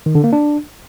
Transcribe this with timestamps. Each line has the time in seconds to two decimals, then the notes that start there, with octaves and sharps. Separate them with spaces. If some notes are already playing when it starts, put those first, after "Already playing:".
0.06 D#3
0.15 D3
0.24 A#3
0.33 D4